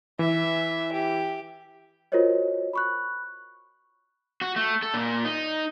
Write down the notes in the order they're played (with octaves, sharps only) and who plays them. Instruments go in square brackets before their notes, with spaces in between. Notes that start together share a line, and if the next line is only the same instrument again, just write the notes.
[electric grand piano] E3 [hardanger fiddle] E5
[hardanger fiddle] G4
[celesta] F4 F#4 A#4 C5 C#5 D#5
B5 C#6 F#6
[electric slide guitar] F#4
A3
A4
A#2
D#4